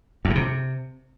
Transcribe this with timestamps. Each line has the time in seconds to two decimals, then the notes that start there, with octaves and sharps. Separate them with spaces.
0.25 E2
0.30 A#2
0.35 C3